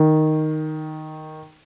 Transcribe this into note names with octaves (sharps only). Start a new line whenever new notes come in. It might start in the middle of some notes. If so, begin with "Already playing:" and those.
Already playing: D#3